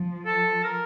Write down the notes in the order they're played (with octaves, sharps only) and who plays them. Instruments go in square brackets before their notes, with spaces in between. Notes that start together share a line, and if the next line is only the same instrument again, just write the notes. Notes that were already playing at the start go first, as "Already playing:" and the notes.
Already playing: [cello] F3
[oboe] A4
A#4